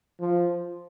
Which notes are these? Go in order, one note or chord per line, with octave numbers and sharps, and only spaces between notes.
F3